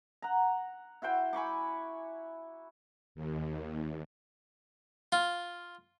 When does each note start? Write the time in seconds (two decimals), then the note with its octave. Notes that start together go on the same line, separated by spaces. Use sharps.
0.22 F#5 A#5
1.02 E4 F#4 C5 G5
1.33 G#5 B5 C#6 D6
3.15 D#2
5.12 F4